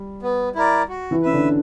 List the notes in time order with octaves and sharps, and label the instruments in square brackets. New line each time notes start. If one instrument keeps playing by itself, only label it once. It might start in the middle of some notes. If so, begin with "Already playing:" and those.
Already playing: [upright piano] G3
[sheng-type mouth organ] B3
E4 A#4 D5
F#4
[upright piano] E3 E4
[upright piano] C#4 [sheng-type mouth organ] B4 E5
[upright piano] D3 D4